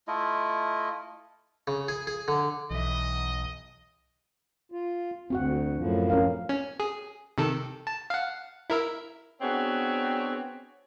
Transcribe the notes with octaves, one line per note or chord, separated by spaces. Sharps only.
A3 E4 F4 D#5
C#3
G#4
G#4
D3
B1 E3 D#5 E5
F4
D2 C4 F#4 F#5
F#2 A2 F3
C#4 A#4 F5
C#4
G#4
C3 D#3 A4
A5
F5 F#5
E4 A#4 E5
B3 C4 D4 F#4 G#4 C#5